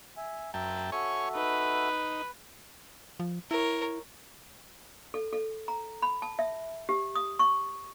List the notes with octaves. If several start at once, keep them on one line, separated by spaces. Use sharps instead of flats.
E5 G#5
F#2 E5 G5 A5 A#5
F#4 A4 C#5 E5 G#5 C#6
D#4 B4
F3
E4 A#4 C#5
A4
A4
A#5
B5
A5
E5
G4
D#6
C#6